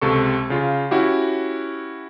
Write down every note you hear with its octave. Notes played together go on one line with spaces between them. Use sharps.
C#2 C3 A4 C#6
C#3 F4
C#4 E4 F#4 G4